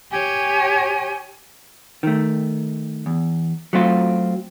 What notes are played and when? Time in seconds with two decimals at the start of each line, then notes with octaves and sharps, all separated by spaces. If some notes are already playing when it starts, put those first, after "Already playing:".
0.12 G4 C#5 G#5
2.03 D#3 A3
3.06 E2
3.73 F#3 A3 C4 F4